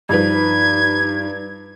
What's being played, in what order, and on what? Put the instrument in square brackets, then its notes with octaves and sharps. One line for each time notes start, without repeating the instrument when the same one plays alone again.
[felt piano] G2 F3 B4 [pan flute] D#4 [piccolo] G#6